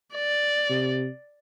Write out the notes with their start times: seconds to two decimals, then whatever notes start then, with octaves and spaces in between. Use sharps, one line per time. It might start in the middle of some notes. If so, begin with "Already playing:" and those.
0.15 D5
0.70 C3